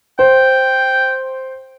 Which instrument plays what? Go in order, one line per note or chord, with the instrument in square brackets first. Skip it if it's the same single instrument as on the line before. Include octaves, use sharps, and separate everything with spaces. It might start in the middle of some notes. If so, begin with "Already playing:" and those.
[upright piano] C5 [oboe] G5